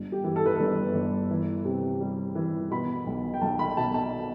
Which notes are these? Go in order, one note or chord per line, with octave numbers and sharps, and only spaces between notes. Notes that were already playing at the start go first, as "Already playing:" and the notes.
Already playing: G1
G4
E3
A4
B4
G1 A4
G1
E3
C3
G3
E3
B2 B5
B1
G5
B1 A5
B5
B2 A5
A5